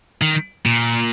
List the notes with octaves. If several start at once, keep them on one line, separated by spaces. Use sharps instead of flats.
D#3
A#2